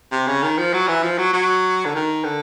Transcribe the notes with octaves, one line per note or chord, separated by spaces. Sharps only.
C3
C#3
D#3
F3
F#3
E3
F3
F#3
F#3
D3
D#3
D3